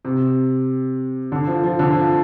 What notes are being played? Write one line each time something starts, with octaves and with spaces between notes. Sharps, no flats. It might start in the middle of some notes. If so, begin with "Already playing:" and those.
C3
D3
F3
F3
D3
F3